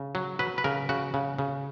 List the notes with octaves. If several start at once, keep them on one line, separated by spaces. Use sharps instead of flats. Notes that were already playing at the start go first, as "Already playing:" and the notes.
Already playing: C#3
F#3
F#3 B4
B4
C#3 A#4
C#3 F#4
C#3
C#3